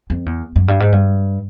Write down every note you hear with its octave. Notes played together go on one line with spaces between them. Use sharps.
F2
E2
F#2
G2
G#2
G2